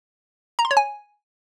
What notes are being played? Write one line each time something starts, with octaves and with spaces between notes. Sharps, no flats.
A#5
C6
C#5
G#5